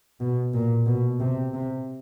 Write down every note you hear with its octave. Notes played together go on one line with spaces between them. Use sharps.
B2
A#2
B2
C3
C3